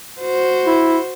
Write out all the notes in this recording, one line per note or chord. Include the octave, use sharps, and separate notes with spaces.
F#4 C5
E4